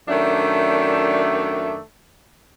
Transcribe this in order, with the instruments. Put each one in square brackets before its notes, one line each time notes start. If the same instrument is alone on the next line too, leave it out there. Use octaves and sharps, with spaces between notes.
[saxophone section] F#2 D#3 A3 D4 D5 E5